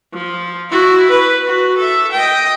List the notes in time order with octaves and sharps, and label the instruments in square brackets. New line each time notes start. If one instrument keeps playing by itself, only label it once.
[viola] F3
E4 F#4
B4
F#4
A4 E5
D#5 G5